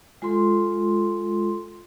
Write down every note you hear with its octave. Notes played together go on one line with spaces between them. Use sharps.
G#3 F4 A4 C6